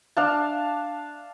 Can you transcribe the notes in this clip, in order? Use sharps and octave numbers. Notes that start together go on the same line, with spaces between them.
D4 F5 A5